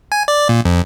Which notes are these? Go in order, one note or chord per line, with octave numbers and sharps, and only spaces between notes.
G#5
D5
A#2
F2